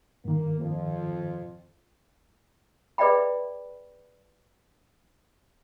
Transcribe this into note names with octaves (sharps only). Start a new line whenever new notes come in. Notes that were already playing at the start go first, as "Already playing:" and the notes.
G2 D#3 A#3
F2 F3
G#4 B4 D5 E5 G5 B5